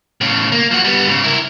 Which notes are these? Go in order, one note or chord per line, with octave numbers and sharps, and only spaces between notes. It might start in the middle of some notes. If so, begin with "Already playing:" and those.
A2 C#3
A#3
F3 F#4
G3 B3
G#2 C#3
E4 A#4